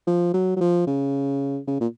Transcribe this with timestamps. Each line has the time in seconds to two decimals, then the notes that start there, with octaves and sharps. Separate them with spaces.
0.07 F3
0.34 F#3
0.56 F#3
0.61 F3
0.87 C#3
1.68 C#3
1.81 A#2